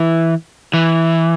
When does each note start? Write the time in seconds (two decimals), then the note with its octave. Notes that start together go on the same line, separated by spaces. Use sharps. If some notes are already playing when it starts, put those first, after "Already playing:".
Already playing: E3
0.74 E3